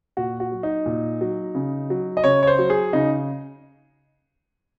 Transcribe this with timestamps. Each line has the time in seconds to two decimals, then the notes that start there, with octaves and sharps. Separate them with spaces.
0.17 A#2 F#4
0.40 F#4
0.52 F#3
0.63 D#4
0.86 A#2
1.21 F#3
1.55 C#3
1.90 F#3
2.17 D#5
2.24 C#3 C#5
2.43 C#5
2.47 C5
2.59 F#3
2.70 G#4
2.93 C#3 D#4